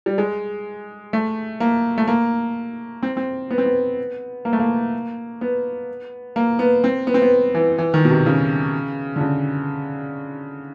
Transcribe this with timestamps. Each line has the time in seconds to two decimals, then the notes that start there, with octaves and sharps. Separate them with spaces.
0.06 G3
0.18 G#3
1.13 A3
1.60 A#3
1.98 A3
2.08 A#3
3.03 C4
3.17 C4
3.51 B3
3.58 C4
3.66 B3
4.45 A#3
4.53 A3
4.60 A#3
5.41 B3
6.36 A#3
6.59 B3
6.84 C4
7.07 B3
7.14 C4
7.22 B3
7.55 E3
7.78 E3
7.94 D#3
8.05 B2
8.10 C3
8.26 C#3
9.16 D3
9.21 C#3